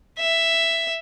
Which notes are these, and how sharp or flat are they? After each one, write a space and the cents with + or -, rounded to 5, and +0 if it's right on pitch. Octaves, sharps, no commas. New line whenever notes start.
E5 +5